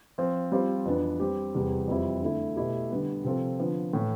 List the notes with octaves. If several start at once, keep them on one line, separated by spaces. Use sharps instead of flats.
F3 C4 F4
G3 C4 F4 C5
F2 E3 B3 D4
G3 C4 G4
E2 C3 G3
F2 E3 G3 C4 E4
D3 A3 E4
B2 A3 E4 G4
D3 G3 B3
C3 F3 C4 F4 A4
D3 F3 B3
A2 E3 A3